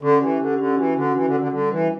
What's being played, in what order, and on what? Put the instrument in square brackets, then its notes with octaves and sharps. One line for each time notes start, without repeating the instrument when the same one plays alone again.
[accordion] D3 [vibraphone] C#4
[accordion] E3 [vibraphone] G4
[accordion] D3 [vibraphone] G4
[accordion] D3 [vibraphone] C#4
[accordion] E3 [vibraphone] F#4
[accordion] D3 [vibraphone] F#4
[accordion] E3 [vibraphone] D4
[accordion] D3
[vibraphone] D4
[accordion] D3
[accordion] D3 [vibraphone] G3
[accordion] E3 [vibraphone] B4